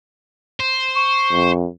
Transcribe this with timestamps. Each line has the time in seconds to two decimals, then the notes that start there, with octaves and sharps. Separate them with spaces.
0.60 C5
0.96 C#6
1.32 F2